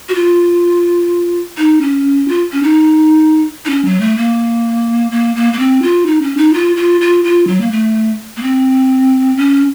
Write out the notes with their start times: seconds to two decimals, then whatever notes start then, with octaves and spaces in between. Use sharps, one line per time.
0.09 F#4
0.15 F4
1.58 D#4
1.81 C#4
2.28 F4
2.52 C#4
2.63 D#4
3.65 D#4
3.70 C#4
3.85 F#3
4.01 A3
4.17 A#3
5.11 A#3
5.36 A#3
5.53 A#3
5.59 C4
5.82 F4
6.06 D#4
6.22 C#4
6.37 D#4
6.54 F4
6.76 F4
7.01 F4
7.24 F4
7.47 F#3
7.61 A#3
7.71 A3
8.37 A#3
8.43 C4
9.37 C#4